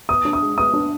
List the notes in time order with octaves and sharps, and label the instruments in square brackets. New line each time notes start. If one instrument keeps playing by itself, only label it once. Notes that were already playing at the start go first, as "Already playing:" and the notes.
[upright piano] B3 [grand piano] D#6
[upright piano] D4
[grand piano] D#6
[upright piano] G#3
[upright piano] B3 [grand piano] D#6
[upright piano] D4